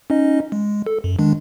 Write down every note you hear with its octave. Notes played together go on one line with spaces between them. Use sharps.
C#4 D#4 D#5
G#3
A4
F#2
D#3 G#3 D4